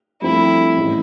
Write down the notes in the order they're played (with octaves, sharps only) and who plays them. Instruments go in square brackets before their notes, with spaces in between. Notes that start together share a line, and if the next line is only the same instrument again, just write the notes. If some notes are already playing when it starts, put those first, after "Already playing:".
[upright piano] G2 F3 A3 C4 [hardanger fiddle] E4
[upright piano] A1 A2 G3